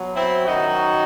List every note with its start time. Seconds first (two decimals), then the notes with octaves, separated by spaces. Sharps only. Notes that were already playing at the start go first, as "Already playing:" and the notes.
Already playing: B2 F#3
0.15 C4 E4
0.46 F#2 D#3 F#3 D#4 F#4